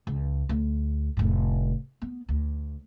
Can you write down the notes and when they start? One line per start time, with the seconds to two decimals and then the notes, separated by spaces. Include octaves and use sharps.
0.07 C#2
0.49 D2
1.17 F1 A2
2.02 B3
2.29 D2